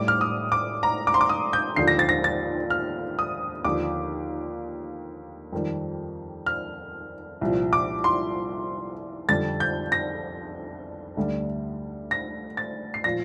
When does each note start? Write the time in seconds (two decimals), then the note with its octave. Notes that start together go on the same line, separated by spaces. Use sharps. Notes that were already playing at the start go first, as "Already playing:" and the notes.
Already playing: A2 G3 D6
0.08 F6
0.21 D#6
0.52 D6
0.83 A#5
1.07 D6
1.14 C6
1.21 D6
1.29 D#6
1.53 G6
1.76 D#2 D3 F3 C7
1.88 A#6
1.99 A6
2.09 A#6
2.24 A6
2.70 F6
3.19 D#6
3.64 D#2 D3 F3 D6
5.52 F2 D#3 G3
6.46 F6
7.41 C2 A#2 F3
7.73 D6
8.04 C6
9.29 F2 D3 G3 A6
9.60 G6
9.92 A#6
11.17 D2 D3 G3
12.11 A#6
12.57 A6
12.94 C7
13.04 A#2 F3 A#6